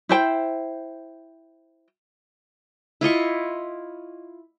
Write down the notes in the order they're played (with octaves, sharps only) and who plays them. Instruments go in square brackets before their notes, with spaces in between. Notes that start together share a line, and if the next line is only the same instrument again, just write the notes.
[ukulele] E4 C5 G5
[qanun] E4 F4 D#5 C#6